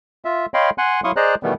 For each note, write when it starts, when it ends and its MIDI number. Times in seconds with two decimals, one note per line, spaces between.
0.25 0.46 65
0.25 0.46 76
0.54 0.70 73
0.54 0.70 75
0.54 0.70 77
0.54 0.70 79
0.54 0.70 83
0.54 0.70 84
0.78 1.01 78
0.78 1.01 80
0.78 1.01 84
0.78 1.01 90
1.04 1.12 54
1.04 1.12 64
1.04 1.12 77
1.04 1.12 84
1.04 1.12 85
1.04 1.12 87
1.16 1.35 68
1.16 1.35 72
1.16 1.35 74
1.16 1.35 75
1.16 1.35 82
1.16 1.35 90
1.43 1.54 47
1.43 1.54 51
1.43 1.54 52
1.43 1.54 55
1.43 1.54 57
1.43 1.54 59